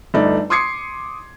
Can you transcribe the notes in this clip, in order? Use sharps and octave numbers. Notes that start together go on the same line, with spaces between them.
G1 A3 D#4 D5
C6 D6 D#6 G#6 C7 C#7